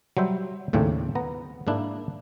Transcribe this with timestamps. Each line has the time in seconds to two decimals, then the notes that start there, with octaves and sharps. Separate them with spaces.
0.17 F#3 G3 C5 E5
0.73 D#2 A2 C#3 C4 D4
1.15 B3 A#5
1.67 G#2 A#3 D4 E4